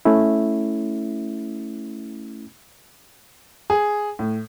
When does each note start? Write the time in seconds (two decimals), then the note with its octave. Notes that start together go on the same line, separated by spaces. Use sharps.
0.05 A3 C#4 E4
3.70 G#4
4.19 A2